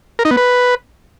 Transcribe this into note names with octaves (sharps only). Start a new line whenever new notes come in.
A#4
D#4
B3
B4